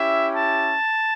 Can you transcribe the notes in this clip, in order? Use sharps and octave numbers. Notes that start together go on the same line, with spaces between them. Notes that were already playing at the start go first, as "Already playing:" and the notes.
Already playing: C#4 E4 G4 E5
A5